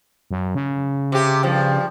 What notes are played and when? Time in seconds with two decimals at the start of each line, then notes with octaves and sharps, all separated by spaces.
0.31 F#2
0.55 C#3
1.12 C3 G4
1.43 G2 F3